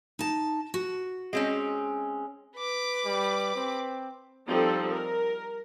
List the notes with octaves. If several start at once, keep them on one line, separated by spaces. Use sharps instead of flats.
D#4 A5
F#4
G#3 C4 C#4
B4 D6
G3
C4
F3 G3 C4 D#4 A4
A#4